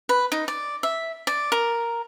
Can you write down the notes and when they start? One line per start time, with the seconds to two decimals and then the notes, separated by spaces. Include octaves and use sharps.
0.09 B4
0.32 D#4
0.48 D5
0.83 E5
1.27 D5
1.52 A#4